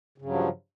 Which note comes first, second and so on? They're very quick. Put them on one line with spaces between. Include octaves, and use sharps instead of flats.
C#3 G2 F#3 F3